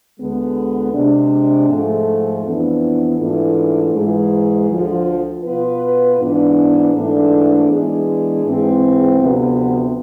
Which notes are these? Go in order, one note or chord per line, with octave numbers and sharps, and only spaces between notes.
D2 D3 G#3 B3
C3 G#3 D4
G#2 F3 A3
F2 E3 B3 D4
G#2 E3 A3 D4 F4
G#2 E3 G#3
D2 D3 F3
B2 B3 F4 B4
G#2 E3 B3 D4
G#2 E3 A3 D4
E3 G#3 B3 D4 G#4
G#2 E3 G#3 C4
D2 C3 F3 B3